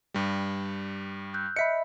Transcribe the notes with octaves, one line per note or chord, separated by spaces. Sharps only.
G2 G3
E6 F#6 G6
D#5 E5 B5 B6 C#7